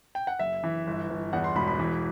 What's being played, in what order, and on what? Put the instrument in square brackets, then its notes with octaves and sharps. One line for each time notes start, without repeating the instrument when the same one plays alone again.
[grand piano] G5
F#5
F#1 E5
E3
G1
G1
E2 F#5
C6
E1 B5
B5
E3